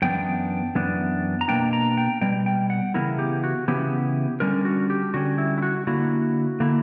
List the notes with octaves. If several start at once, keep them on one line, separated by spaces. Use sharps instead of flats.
F#2 E3 B3 D4 G5
F#2 E3 B3 D4
A#5
B2 G3 A#3 D4 G5
A#5
G5
B2 G3 G5
G5
F#5
C#3 E3 B3 E4 A#4
G4
F#4
C#3 E3 B3 E4 G4
D3 G3 C#4 A#4
F#4
G4
D3 G3 C#4 F#4
E4
E4
F#4
D3 A#3 E4 F#4
D3 A#3 E4